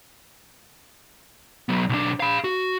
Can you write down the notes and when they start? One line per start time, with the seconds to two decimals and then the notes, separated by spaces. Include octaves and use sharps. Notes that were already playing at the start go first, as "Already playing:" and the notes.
1.69 F#3 B3
1.89 B1 D4
2.20 F5 B5
2.44 F#4